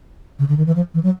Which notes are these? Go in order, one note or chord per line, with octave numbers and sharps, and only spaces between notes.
C#3
D3
D#3
E3
F3
E3
F#3